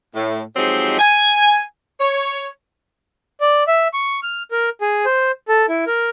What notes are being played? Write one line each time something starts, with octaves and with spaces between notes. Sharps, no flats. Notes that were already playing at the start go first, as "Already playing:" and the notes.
A2
F3 F#3 G#3 C4 D#4 G4
G#5
C#5
D5
E5
C#6
F6
A#4
G#4
C5
A4
E4
A#4